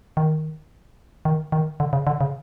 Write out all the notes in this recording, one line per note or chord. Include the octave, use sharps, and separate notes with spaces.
D#3
D#3
D#3
D3
C#3
D3
C#3